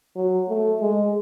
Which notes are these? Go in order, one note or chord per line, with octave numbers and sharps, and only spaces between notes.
F#3
A3
G#3